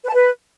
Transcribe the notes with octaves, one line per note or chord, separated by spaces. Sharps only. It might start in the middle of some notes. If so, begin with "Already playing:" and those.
B4
A5
B4